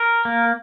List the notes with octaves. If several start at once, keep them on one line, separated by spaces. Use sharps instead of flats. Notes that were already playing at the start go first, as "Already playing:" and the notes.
Already playing: A#4
A#3